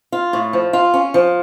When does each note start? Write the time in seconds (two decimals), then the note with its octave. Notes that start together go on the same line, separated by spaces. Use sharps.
0.12 F4
0.33 A2
0.53 F3
0.73 F4
0.94 C#4
1.14 F3